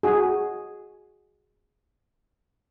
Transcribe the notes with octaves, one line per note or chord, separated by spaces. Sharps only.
F#4 G#4